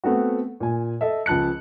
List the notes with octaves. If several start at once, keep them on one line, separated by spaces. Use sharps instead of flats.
A3 B3 C4 F#4
A#2 G#5
A4 D#5 E5
C#2 F3 A5 F#6 C#7